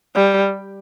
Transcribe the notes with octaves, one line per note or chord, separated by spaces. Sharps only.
G3